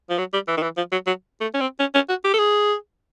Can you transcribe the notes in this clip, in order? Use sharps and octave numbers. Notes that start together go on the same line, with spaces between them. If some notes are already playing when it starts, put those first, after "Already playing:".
F3
F#3
G3
E3
D#3
E3
F3
F#3
F#3
A3
C#4
C4
C#4
C#4
F#4
G4
A4
G#4